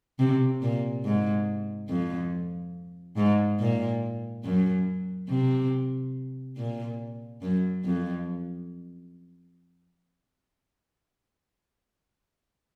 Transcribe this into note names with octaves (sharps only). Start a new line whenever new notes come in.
C3
A#2
G#2
F2
G#2
A#2
F#2
C3
A#2
F#2
F2